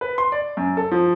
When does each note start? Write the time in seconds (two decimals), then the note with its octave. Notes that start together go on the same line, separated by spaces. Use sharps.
0.01 B4
0.18 C6
0.32 D5
0.57 F#2
0.77 A4
0.91 F3